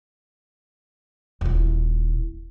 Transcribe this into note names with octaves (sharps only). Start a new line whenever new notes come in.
D#1 E4